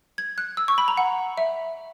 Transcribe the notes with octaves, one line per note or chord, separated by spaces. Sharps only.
G#6
F#6
E6
C#6
B5
A#5
F#5
E5